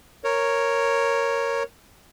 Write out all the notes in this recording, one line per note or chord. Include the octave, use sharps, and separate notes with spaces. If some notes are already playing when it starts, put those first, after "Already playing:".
A#4 C#5